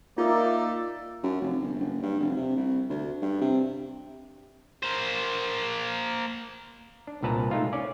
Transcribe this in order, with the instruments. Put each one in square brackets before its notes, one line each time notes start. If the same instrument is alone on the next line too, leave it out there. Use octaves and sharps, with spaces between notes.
[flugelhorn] A#3 [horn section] D#4 E5 [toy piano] F4 [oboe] D5
[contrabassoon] F#2
F1
G1
F#1
G2
F1
C3
C2
D2
G2
C3
[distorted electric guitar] A#3 C5
[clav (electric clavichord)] D4
C2 A#2 B4 A5 A#5
G#3 A3 D#4 F4
C#4 D5